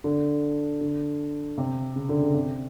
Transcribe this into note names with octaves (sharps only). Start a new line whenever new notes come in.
D3
D3
C3
C#3
D3
C#3
C3